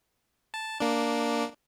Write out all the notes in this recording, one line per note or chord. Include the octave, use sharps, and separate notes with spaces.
A5
A#3 D4